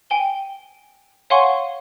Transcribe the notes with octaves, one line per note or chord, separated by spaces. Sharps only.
G5 G#5 G7
C#5 F5 F#5 G#5 C6 C#6